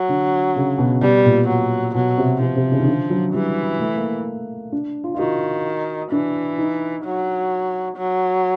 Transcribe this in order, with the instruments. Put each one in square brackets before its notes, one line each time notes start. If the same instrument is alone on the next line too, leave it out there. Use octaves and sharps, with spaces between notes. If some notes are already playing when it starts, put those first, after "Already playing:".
Already playing: [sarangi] F#3
[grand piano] D3
C#3
B2
[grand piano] B2 [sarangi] G3
[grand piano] A#2
[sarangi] F#3
[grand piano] B2 [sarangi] F#3
[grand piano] C3
[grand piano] C3 [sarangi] F3
[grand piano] C3
C#3
D#3
D3
F#3
[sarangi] E3 [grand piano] G3
[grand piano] A3
A#3
D4
F4
F4
[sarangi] D#3 [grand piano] F#4
[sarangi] E3 [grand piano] D4
[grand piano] D#4
[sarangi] F#3
F#3